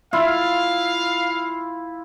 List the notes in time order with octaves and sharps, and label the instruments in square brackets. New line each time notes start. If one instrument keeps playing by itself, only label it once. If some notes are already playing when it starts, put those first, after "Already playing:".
[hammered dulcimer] E4 F4 [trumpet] F5